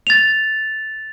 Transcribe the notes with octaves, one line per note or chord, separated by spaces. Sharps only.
A6 F7